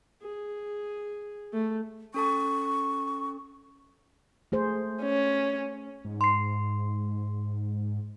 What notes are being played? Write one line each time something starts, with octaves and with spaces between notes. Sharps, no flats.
G#4
A3
C#4 A4 A5 C#6
A3 G#4 C5
C#4
G#2
C6 C7